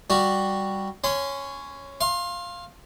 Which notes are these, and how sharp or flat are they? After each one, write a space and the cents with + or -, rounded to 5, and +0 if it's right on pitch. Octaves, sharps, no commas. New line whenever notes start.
G3 +0 F#4 +0
C#4 +0 C6 -30
F5 +0 C6 +30